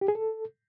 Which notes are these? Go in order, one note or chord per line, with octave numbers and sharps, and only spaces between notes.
G4
G#4
A4